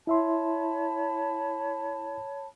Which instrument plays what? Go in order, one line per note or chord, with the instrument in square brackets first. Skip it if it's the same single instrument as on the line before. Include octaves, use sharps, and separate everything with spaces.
[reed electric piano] E4 E5 C6 [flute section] C#5 A5 B5